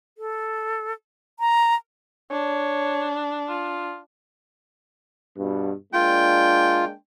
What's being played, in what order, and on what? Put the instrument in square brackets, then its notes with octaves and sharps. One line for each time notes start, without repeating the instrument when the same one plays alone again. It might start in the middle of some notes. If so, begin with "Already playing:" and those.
[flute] A4
A#5
[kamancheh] D4 [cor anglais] C#5
[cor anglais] F4
[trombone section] G2 B2
[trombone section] G#3 A#3 D4 [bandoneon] F4 [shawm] G5